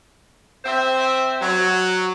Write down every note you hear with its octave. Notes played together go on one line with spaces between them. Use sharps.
C4 C5 E5
F#3